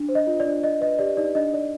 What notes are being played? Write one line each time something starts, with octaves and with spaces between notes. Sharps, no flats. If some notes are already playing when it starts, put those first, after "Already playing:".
Already playing: D4
C5
D#5
F4
D5
D4
D5 D#5
B4 D#5
G4 D5
D#4 D5
D4 D#5
D5